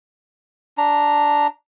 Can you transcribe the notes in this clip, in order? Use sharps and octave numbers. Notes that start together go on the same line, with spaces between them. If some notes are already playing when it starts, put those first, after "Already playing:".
D4 A#5